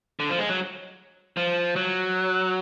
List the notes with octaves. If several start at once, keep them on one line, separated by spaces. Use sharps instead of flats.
D3
F3
G#3
F#3
F3
F#3